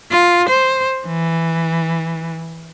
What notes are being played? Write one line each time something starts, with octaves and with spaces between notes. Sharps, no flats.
F4
C5
E3